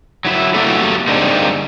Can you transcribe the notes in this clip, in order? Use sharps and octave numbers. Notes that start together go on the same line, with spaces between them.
F#3 E4
F#3 A3 A#3 F#4 G4 A4
D3 G3 G#3 A#3 C4 D#4